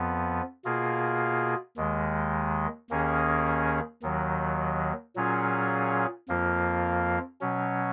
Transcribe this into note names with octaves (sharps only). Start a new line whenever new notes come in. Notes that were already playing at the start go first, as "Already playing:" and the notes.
Already playing: F2 F3 B3
B2 A#3 F4 G#4
D#2 D#3 G#3
D#2 D#3 A#3 C#4 G#4
D#2 D#3 F#3
A#2 F#3 C#4 F4 G#4
F2 F3 A#3 F4
B2 F#3 C#4